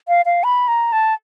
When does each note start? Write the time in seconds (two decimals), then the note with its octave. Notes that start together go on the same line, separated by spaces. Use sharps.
0.08 F5
0.26 F5
0.44 B5
0.68 A#5
0.92 A5